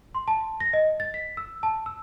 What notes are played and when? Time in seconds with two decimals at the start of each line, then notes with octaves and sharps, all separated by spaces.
0.15 C6
0.28 A5
0.60 A#6
0.73 D#5
1.00 A6
1.14 B6
1.37 E6
1.63 A5
1.86 E6